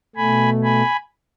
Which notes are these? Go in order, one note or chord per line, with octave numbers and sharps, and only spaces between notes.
B2 A3 G#5 B5
G#5 B5